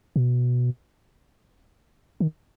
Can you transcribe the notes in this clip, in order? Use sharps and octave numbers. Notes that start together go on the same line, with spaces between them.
B2
D#3